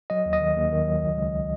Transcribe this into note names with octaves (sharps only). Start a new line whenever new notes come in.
F#3 D#5
D#2
D#5
D#3
D#2
D#3
F#3
C#2
C#2